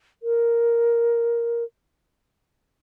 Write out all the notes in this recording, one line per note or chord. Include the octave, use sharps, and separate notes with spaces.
A#4